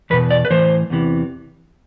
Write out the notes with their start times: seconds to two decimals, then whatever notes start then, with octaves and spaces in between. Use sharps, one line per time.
0.10 E2 B2 B4
0.31 D5
0.45 B4
0.50 A2 E3 C5
0.90 E2 C3 E3